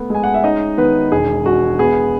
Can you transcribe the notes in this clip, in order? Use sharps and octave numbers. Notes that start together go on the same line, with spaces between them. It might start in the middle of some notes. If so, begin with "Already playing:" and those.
Already playing: A3 B3
G#3 G#5
F#5
E5
C#4 D#4 D#5
D#3 B3 B4
E1 G#4
E1 F#4
B3 G#4